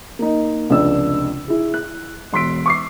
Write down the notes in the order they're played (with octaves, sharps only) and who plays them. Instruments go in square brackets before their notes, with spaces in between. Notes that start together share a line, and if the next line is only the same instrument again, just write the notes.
[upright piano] A#3 D#4
F1 C#2 D4 D5 E6
E4 G#4
F#6
E1 C6 E6 B6 D7
C#6 D6 C7